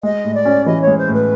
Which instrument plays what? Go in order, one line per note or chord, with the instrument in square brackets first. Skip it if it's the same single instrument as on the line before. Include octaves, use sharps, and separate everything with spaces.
[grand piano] G#3 [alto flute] D#5
[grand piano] A2
[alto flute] D5
[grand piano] C#4
[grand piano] E3 [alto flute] D#5
[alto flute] C#5
[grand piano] G#3
[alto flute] C5
[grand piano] A2
[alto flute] B4